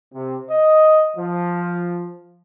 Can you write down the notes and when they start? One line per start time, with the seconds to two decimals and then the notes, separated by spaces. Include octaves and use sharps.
0.14 C3
0.51 D#5
1.17 F3